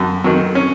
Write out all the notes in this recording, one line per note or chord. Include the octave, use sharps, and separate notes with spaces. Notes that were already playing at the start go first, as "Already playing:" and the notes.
Already playing: F#2
D#3 F#3
C#4